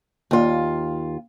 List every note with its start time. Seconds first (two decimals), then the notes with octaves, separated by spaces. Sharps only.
0.31 D#2 F4